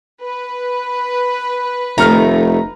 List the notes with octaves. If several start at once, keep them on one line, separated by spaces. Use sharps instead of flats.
B4
F1 D#3 A3 A#5 F6